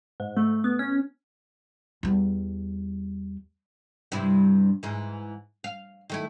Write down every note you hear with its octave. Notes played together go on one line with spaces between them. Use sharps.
G#2
A3
B3
C#4
E2 G3
G2 C3 E4
G#2 E3
F5
D#3 A3 E4